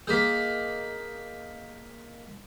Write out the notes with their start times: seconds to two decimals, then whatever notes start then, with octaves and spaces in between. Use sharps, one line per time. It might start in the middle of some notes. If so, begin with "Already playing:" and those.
0.07 A#3 D#4 G#4 G6 B6